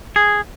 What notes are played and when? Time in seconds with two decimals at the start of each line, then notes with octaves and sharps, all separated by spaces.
0.16 G#4